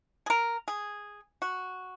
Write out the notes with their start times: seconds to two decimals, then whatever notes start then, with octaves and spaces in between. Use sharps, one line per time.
0.26 G#4
0.30 A#4
0.68 G#4
1.42 F#4